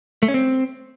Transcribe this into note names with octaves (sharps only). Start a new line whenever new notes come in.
A3
C#4
C4